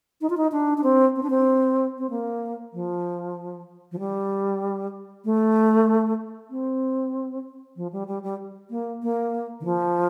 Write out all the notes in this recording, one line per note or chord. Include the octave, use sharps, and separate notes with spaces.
D#4
F4
D#4
D4
D4
C4
C4
D4
C4
C4
A#3
F3
F3
G3
A3
C4
F3
G3
G3
G3
A#3
A#3
D#3
F3